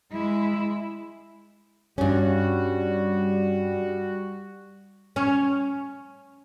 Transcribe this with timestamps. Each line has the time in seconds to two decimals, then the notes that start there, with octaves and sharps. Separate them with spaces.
0.12 G#3 E4
1.98 G2 G3 C#4 F#4
5.16 C#4